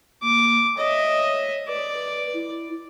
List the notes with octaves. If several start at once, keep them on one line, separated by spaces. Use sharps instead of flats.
A#3 D6
C#5 D#5 E5
B4 D5
E4